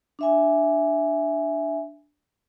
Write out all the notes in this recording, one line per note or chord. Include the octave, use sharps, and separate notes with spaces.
D4 E5 G#5